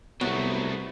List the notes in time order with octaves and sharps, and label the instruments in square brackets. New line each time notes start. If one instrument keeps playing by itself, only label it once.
[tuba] C2 [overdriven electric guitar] B2 A3 [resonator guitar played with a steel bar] F#3 B3